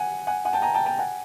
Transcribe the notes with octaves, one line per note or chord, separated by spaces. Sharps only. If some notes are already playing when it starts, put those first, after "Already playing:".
Already playing: F#5 G#5
F#5 G#5
F#5 G#5
G5 A5
G#5 A#5
G5 A5
G5 A5
F#5 G#5